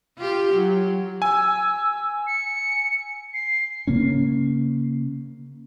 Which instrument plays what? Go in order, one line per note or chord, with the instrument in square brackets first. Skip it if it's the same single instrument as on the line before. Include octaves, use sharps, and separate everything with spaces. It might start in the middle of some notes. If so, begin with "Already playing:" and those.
[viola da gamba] F4 G4
F#3
[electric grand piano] G#5 [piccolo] E6
[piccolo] C#7
C7
[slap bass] C#3 A#3 C#4